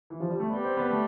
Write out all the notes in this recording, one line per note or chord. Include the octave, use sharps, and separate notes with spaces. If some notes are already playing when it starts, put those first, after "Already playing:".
E3
F3
G3
A3
G3 B3
C4
B3
A3